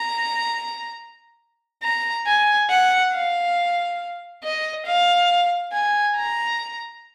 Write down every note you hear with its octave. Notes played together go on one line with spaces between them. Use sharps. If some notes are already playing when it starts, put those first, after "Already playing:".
Already playing: A#5
A#5
G#5
F#5
F5
D#5
F5
G#5
A#5